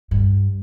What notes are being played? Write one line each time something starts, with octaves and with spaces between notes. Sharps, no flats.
G2